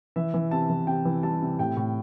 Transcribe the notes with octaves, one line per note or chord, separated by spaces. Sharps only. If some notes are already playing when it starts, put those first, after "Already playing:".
E3 E5
E3
C3 A5
E3
C3 G5
E3
G3 A5
C3
A2 G5
A2